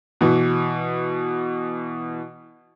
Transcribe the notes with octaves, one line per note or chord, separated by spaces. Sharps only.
B2 E3